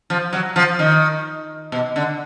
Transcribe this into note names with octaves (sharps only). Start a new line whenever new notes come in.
F3
F#3
F3
D#3
B2
D3